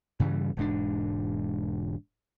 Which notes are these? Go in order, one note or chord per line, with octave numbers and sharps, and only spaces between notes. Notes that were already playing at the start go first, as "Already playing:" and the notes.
G2 C#3 E3 G3
E1 G#2 D4